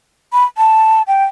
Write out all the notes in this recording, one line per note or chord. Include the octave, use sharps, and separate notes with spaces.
B5
A5
G5